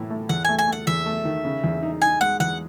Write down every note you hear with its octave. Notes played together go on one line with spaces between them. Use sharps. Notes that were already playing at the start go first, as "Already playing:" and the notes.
Already playing: A2 E3
A3
E2 F#5
A3 G#5
G#5
A3 F#5
E2 E5
A3
D#3
C#3
E2
D#4
D#4 G#5
G#3 F#5
E2 F#5